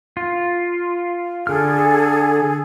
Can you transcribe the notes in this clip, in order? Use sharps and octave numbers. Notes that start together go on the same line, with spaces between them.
F4
D3 G#4 A4 F6